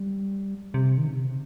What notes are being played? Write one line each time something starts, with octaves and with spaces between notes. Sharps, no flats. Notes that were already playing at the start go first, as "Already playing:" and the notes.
Already playing: G3
C3
D#3
C#3
C3
C#3